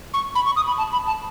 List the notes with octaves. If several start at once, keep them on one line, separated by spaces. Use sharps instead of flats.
C#6
B5
C#6
D#6
B5
A5
B5
A5